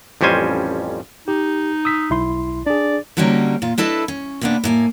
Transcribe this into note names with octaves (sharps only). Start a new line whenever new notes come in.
A1 F2 G3 C#4 C5 G#5
D#4 G4
D#6 E6 B6
B1 E4 C6
D4 G#4 D5
D3 F#3 G3 A#3 C#4 D#4
A#2 F4
D4 E4 A4 B4 D#5 E5
C#4
C3 A#3 B3 C#4 D4
A2 A#3 G#5